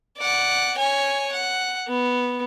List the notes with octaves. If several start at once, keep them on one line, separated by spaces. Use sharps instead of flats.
D5 F#5
C#5 G#5
F#5
B3